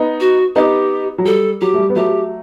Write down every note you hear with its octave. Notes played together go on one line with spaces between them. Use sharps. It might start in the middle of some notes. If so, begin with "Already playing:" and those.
Already playing: B3 D#4
F#4
B3 D#4 G4
F#3
G3 A4
F#3 G4
A3
G3
B3
F#3 A3 G4